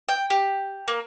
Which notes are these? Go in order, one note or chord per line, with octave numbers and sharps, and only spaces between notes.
G5
G4
A#3